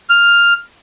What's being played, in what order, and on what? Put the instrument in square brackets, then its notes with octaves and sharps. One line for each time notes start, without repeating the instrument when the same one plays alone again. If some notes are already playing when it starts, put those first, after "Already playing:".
[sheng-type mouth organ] F6